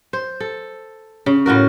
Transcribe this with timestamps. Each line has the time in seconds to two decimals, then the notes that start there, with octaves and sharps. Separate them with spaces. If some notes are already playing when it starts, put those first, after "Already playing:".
0.13 C5
0.40 A4
1.26 C#3
1.46 A2 F4 F#4 A#4